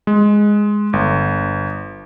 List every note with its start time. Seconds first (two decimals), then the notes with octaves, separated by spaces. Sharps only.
0.07 G#3
0.93 G1